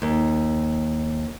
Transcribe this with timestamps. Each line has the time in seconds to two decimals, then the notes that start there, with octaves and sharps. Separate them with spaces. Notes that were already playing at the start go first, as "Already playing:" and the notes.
0.02 D#2